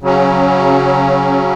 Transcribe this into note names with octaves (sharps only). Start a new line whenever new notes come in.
C#3 F#3 C#4